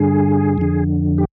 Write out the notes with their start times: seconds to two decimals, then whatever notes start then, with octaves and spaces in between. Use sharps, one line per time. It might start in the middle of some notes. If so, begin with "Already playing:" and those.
Already playing: G2 D3 G#4
0.58 F2 D3
1.18 G4